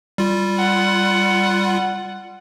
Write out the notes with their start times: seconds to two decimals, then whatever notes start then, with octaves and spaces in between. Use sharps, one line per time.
0.18 G3 F4
0.58 F#5